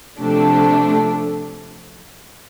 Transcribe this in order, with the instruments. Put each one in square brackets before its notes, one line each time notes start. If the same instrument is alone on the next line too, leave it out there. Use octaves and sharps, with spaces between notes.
[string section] C3 F3 A3 D4